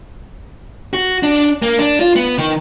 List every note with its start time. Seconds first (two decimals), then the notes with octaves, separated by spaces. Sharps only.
0.93 F#4
1.23 D4
1.62 A#3
1.79 D4
2.00 F4
2.16 B3
2.38 D#3